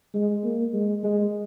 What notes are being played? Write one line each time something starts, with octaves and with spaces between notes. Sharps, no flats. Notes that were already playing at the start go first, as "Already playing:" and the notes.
G#3
A#3
G#3
G#3